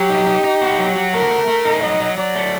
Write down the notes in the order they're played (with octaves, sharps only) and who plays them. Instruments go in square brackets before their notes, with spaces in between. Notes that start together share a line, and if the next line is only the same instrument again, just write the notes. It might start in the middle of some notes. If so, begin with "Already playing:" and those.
Already playing: [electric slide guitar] F#3 [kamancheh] G4
[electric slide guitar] D#4
D#4
D#4
F#4
F#3
F#4
[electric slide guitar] A3 [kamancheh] A#4
[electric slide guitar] A3
A3
D#4
[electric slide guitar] F#3 [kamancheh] D#5
[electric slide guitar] F#3
[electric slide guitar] F#3 [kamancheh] D5
[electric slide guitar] A3